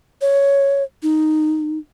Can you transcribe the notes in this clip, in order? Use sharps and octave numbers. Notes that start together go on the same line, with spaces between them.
C#5
D#4